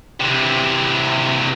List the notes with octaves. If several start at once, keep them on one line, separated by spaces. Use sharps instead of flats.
C3 E3